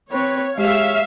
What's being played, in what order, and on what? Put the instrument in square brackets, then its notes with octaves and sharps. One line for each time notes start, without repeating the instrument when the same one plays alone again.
[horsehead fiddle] C4 B4 [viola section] C#5
[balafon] G#3 G4 [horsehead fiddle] G#4 C#5 [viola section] E5 F5